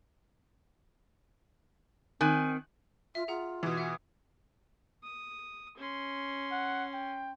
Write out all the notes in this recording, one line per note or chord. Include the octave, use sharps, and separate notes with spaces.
D#3 C4 G#5 F#6
F4 E5
F4 G#4 F#5 A#5
B2 E3
E5 F#5
D#6
C#4 C6
F#5
G5